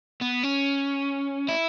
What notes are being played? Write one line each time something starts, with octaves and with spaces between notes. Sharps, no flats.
B3
C#4
E4